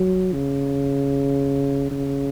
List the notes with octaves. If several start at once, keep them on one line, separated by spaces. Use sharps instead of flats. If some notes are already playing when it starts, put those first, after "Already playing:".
Already playing: F#3
C#3
C#3